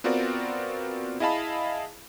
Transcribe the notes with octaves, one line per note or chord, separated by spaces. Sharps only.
B3 C4 F4 F#4 A#4 D5
E4 G#4 D#5 F5 A5 B5